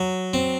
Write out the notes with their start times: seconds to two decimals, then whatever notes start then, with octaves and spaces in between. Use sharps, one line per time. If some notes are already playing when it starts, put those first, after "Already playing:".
Already playing: F#3
0.34 C4